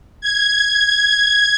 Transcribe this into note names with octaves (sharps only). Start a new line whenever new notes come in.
G#6